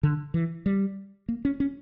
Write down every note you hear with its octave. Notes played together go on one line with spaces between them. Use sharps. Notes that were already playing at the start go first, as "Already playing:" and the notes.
D3
E3
G3
A#3
C#4
C#4